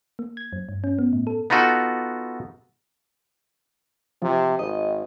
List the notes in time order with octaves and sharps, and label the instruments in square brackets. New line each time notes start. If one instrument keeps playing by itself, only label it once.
[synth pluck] A#3
G#6
F#2
G2
C#4
B3
A2
A4
[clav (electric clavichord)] B3 D#4 F4 F#4 A4
[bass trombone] C3 [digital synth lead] F3
[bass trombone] G#1 [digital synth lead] D#5